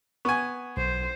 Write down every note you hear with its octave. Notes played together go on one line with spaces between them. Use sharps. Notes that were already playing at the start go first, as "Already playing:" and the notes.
B3 G#5 C#6
B1 C5